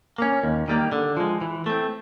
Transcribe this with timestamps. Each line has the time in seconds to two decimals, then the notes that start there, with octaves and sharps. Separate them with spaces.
0.18 A#3 C#4
0.43 D#2
0.68 D#3 G3 A#3
0.92 D3
1.17 F3 G#3
1.41 E3
1.66 A3 C4